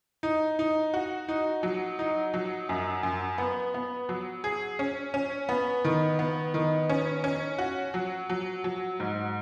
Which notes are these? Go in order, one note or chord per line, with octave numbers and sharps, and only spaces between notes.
D#4
D#4
F#4
D#4
F#3
D#4
F#3
F#2
F#2
B3
B3
F#3
G#4
C#4
C#4
B3
D#3
B3
D#3
C#4
C#4
F#4
F#3
F#3
F#3
G#2